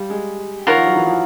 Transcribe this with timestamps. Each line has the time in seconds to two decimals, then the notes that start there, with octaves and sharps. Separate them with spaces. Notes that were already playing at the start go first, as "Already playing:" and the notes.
Already playing: G3 F5
0.10 G#3
0.67 D#3 F4 A#4 C#5 F#5
0.77 F3
0.86 F#3
0.96 E3
1.06 F3